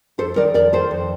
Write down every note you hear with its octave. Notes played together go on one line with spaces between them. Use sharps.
F2 A4 C5
D#3 A#4 D5
F2 A#4 D5
D#3 A4 C5
F2